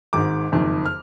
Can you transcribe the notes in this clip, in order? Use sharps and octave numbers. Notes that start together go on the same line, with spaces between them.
G#1 G#2 D#3 D6
F#1 F2 D#3
F6